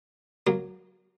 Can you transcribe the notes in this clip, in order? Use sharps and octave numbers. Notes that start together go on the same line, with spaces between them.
F#3 A#3